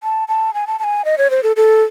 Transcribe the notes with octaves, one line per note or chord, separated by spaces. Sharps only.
A5
A5
G#5
A5
A5
G#5
D#5
C#5
C5
A4
A4